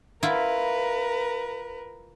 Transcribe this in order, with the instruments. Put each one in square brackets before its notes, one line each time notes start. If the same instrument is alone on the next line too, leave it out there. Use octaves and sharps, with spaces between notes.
[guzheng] E4 F4 [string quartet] A#4 B4